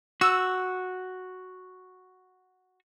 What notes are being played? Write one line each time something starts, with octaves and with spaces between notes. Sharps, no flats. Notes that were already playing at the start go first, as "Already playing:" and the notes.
F#4 E6